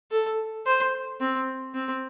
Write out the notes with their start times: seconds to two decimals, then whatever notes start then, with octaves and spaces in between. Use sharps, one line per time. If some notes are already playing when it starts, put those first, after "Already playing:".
0.11 A4
0.66 C5
1.21 C4
1.75 C4